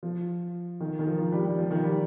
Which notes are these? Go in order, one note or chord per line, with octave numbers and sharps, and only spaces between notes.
F3
D#3
D#3
F3
F3
G3
G3
F3
D#3
G3